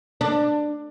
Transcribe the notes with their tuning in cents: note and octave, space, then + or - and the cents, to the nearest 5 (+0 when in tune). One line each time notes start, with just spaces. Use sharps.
D4 +15